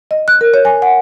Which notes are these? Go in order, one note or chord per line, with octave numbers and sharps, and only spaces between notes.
D#5
F#6
A#4
C#5
G#5
F#5